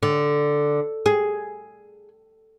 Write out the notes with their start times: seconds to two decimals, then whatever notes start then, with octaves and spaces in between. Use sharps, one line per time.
0.03 D3
1.06 G#4